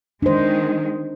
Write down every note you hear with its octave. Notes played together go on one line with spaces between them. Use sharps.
D#3 G#3 D4 C5